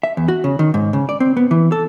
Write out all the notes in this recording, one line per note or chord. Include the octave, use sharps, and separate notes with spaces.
E5
E2
F#4
C#3
D#3
G#2
C#3
D5
C4
B3
E3
A4